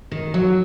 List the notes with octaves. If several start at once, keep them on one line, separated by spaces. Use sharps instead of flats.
D#3
F#3